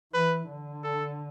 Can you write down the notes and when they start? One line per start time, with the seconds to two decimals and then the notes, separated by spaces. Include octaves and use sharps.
0.13 E3 B4
0.49 D3
0.83 A4